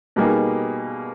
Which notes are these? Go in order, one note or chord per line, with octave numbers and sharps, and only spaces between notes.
B2 G3 A#3 D#4 G#4